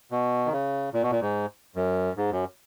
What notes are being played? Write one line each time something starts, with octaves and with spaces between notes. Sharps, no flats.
B2
D#3
C#3
A#2
B2
A#2
G#2
F#2
G#2
F#2